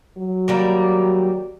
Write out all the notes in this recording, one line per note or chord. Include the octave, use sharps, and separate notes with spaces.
F#3
D#3 G3 A#3